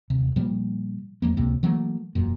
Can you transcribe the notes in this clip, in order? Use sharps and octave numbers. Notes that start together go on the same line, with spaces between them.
D#1 C3
A#2 F3 G3 A#3
E2 F3 A3 A#3
C#2 A2 C3 A#3
E3 F#3 A3 A#3
E1 F#2 A#2